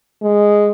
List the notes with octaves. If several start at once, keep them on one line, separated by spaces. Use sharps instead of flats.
G#3